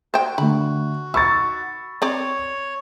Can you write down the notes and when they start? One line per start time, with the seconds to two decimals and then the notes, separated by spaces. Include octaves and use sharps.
0.14 F#4 C5 G5
0.38 D3 A3 B5
1.14 D#3 B5 C#6 E6 A6
2.02 C4 C#5 D5